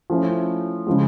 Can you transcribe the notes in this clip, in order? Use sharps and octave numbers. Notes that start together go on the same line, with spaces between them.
F3 A3 C#4 E4
C#3 F3 G#3